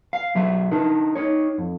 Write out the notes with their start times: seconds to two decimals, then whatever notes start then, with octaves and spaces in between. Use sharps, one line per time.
0.13 F5
0.35 B1 F#3 E5
0.71 D4 D#4 A#4
1.15 D#4 C#5
1.58 F2